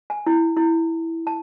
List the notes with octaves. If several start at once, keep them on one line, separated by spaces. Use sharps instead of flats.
G#5
E4
E4
A5